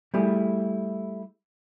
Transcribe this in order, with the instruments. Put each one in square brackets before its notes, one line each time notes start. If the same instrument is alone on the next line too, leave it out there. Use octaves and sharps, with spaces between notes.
[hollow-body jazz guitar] G3 A3 E4 G4 G#4